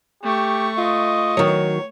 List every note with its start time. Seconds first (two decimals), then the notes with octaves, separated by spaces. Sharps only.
0.23 A3 G4 C#6
0.78 F4 D#5
1.37 D#3 F#3 C#5